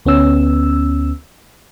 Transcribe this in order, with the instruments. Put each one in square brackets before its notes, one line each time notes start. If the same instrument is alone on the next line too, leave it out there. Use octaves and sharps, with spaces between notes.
[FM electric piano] D2 B3 C#4 E6